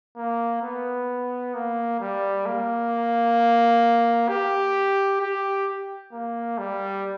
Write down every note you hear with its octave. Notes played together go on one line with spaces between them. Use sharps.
A#3
B3
A#3
G3
A#3
G4
G4
A#3
G3